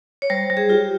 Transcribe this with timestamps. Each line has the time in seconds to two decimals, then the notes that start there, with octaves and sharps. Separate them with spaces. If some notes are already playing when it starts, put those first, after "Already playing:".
0.22 C#5
0.30 G3 C5
0.50 G3
0.57 G#4
0.69 F4 G4